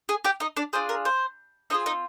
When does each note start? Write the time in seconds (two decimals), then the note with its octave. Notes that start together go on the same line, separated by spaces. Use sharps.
0.09 G#4 G#5
0.24 G4 G5
0.40 D#4 D#5
0.57 D4 D5
0.73 D4 F4 G#4 C5
0.89 A#4
1.05 C5
1.70 C4 D#4 F4 G#4 D#5
1.86 D#4 D#5